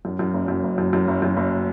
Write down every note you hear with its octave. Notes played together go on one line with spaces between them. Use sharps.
F#2
F#2
F#1
F#2
F#1
F#2
F#2
F#1
F#2
F#1